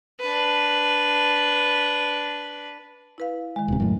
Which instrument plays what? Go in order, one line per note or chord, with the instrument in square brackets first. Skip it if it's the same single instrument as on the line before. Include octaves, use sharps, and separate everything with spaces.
[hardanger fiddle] D4 B4
[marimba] E4 B4 F5
D#3 G#3
[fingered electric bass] D#1 C3
F#2 A2